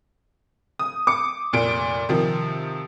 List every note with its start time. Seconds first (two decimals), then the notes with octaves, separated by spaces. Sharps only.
0.79 D#6
1.07 D6 C#7
1.53 F1 A#2 D7
2.09 C3 D#3 F3